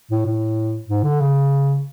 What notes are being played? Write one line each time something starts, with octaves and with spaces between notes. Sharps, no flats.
A2
A2
G#2
D3
C#3